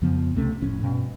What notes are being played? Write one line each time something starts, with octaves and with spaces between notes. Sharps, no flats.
F2 C#3 F3 B3
C#2 C3 A3 C#4
F1 F2 A2 C#4
G2 B2